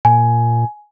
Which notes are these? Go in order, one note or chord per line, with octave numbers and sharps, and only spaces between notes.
A#2 G#5